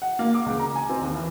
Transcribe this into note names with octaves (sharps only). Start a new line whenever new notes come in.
F#5
A#3
D6
C#2
A#5
G#5
C4
D#2
E3